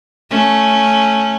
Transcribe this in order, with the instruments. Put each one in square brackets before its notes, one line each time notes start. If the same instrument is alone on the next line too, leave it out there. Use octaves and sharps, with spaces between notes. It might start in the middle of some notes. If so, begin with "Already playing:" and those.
[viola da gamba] A3 C#4